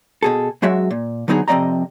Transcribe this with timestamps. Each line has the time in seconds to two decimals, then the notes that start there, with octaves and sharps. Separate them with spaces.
0.23 B2 G#4 A4
0.62 F#2 F#3 G#3 F#4 E5
0.91 A#2
1.28 D3 F#3 B3 D#4 G4 G#4
1.48 F2 C3 G#3 D5 D#5 A#5